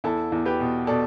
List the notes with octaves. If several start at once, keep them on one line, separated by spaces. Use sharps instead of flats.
E2 E4 A4
E2
G4 B4
B2
B2 A4 D5